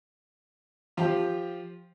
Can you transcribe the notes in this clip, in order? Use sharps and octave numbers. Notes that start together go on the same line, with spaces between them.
F3 F4 G4